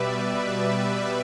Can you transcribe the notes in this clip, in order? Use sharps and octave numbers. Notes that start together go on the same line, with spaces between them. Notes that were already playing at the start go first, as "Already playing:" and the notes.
Already playing: B2 G3 B4 D5 E5
D5